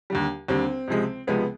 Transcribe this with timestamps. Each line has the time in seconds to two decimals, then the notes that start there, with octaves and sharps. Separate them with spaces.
0.10 D#2 D3 G3
0.48 D#2 D3 G3 C4
0.88 C#2 C3 F3 G#3
1.27 C#2 C3 F3 G#3 B3